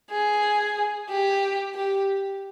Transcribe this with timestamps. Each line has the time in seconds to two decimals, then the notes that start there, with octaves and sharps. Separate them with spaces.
0.11 G#4
1.09 G4
1.75 G4